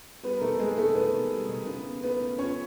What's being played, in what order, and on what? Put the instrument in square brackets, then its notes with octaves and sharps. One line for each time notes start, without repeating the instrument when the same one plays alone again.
[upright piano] G3 B3 B4
A#4
D#3 A3 A4
G#3 C4 G#4
D#3 A3 A4
D#3 B3 B4
D#3
G3
D#3
C#3 B3 B4
C#3
A3 B3 B4
C#3
F3 C#4 C#5